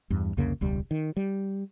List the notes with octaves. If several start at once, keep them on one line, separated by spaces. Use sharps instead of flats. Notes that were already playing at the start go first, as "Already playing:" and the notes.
E2 G2
C2 F2 C#3 A#3
E1 C#2 G3
D#3
G3